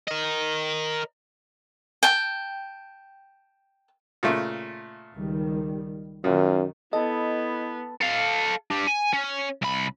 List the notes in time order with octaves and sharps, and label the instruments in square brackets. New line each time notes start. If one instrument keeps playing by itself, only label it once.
[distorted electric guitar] A#4 D#5
[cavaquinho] G5 A5
[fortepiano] A#2 C#3 A3
[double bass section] C#2 D#3 G3
[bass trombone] F#2 [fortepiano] A#2 [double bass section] D#3
[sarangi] B3 [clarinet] E4 [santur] A4 C6 [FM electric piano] D#5
[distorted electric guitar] A4 F5
D4 G4
G#5
C#4
C2 B5